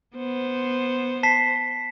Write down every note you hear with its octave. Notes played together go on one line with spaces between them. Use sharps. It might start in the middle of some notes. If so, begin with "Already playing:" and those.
B3 C5
A5 B6 C7